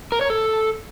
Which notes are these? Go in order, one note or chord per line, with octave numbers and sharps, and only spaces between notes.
A#4
C#5
A4